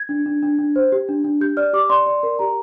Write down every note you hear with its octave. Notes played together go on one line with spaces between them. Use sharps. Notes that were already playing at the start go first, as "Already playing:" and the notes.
Already playing: G#6
D4
D4
D4
D4
C5
G4
D4
D4
G4 G6
D5 F6
G4 D6
D5 C6
D5
A#4
G4 A#5